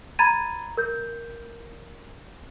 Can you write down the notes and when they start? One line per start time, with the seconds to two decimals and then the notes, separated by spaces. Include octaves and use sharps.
0.19 A#5 B5 G#6 A6 D#7
0.77 A#4 G6